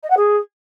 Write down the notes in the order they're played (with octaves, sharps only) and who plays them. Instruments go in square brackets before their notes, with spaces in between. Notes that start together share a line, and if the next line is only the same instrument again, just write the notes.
[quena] D#5
F#5
G#4